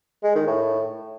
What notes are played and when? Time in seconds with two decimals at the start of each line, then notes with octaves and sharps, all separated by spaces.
0.24 G#3
0.35 D#3
0.47 A2